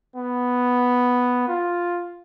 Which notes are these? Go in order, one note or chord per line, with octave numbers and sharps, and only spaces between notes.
B3
F4